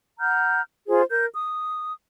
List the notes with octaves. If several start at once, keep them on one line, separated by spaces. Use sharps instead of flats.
F#5 A#5 F6 G6
F4 G#4 C5
A#4 G6
D#6